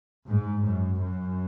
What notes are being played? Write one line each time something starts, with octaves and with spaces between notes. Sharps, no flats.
G#2
F#2
F#2